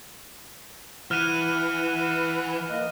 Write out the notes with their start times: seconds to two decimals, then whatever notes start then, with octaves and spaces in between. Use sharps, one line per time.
1.11 E3 F#5 F6 F#6 D#7
2.70 A#3 D#5